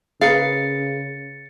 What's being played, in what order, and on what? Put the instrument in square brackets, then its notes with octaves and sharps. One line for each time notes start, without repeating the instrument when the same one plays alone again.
[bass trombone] C#3 [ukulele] G#4 A#4 B4 [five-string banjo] F5 [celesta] A6 C#7